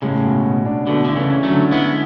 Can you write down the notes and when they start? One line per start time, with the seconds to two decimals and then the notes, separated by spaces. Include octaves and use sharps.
0.02 A2 C#3 G#3
0.24 B2
0.45 B2
0.65 D4
0.87 B2 D3 A3
1.05 D3 E4
1.16 C#3 E3
1.30 C#4
1.43 F#3 A3
1.51 D3
1.71 G#3 B3 E4